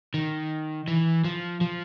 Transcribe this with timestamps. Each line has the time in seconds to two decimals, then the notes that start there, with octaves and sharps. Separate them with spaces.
0.14 D#3
0.88 E3
1.24 F3
1.61 F3